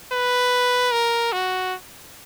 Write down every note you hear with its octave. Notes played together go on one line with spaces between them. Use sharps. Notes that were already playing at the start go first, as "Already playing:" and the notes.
B4
A#4
F#4